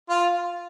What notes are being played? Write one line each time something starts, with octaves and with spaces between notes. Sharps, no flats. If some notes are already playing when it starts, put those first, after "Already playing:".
F4